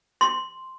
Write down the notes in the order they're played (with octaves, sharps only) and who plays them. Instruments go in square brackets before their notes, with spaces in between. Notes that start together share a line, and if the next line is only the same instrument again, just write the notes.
[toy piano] C6